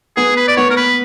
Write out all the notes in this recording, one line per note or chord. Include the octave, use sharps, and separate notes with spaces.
B3 G#4
B4
D5
B3 C#5
A#4
B4